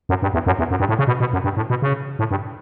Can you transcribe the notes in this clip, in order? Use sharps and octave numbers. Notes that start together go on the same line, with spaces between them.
F#2
G2
E2
F#2
E2
F#2
G2
A2
C#3
B2
B2
F#2
G2
A2
B2
C#3
A2
G2